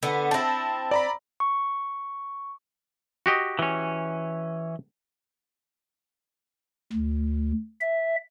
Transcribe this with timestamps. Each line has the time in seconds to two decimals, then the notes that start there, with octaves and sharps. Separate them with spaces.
0.03 D3 B3
0.31 C4 E4 A5 A#6
0.91 D5 A#5 B5
1.40 C#6
3.26 F#4 G4 D#5
3.59 E3 C#4
6.92 D2
7.81 E5